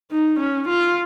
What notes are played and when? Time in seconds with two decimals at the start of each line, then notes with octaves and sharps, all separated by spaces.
0.12 D#4
0.40 C#4
0.69 F4